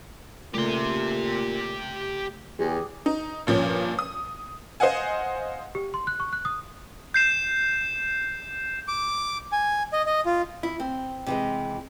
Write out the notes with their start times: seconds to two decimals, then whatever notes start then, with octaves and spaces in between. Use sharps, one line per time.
0.55 A#2 C#3 A3 G4 C6
2.59 E2 G4 G#4
3.06 D#4
3.47 G2 A#2 F3 C#4
3.99 D#6
4.80 C5 D#5 F5 F#5 G#5
5.75 G4
5.94 C6
6.07 F#6
6.20 C#6
6.33 F#6
6.45 D#6
7.14 G6 C7 E7
8.88 D6
9.52 G#5
9.93 D#5
10.06 D#5
10.26 F4
10.63 E4
10.80 C4
11.26 C3 E3 G#3